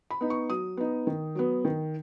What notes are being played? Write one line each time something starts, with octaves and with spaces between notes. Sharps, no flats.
B5
B3 D#4
C#6
F#3 D#6
B3 D#4
D#3
F#3 B3
D#3